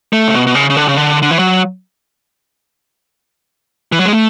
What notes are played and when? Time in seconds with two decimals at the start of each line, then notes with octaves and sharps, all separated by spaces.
0.13 A3
0.28 C#3
0.34 B2
0.47 B2
0.55 C#3
0.70 C#3
0.77 D3
0.88 C#3
0.97 D3
1.22 D3
1.31 E3
1.39 F#3
3.92 E3
3.99 F#3
4.05 G#3
4.13 A3